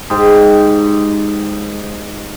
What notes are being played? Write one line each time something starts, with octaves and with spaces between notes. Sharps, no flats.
G#2 G4